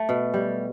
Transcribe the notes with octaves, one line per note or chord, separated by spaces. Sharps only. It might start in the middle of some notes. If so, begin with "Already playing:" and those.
Already playing: A3
B2
G3